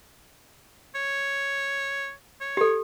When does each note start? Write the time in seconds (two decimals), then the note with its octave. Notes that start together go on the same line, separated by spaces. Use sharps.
0.95 C#5
2.41 C#5
2.57 G4 A4